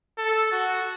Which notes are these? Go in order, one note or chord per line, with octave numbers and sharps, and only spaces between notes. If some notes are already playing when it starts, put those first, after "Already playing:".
A4
F#4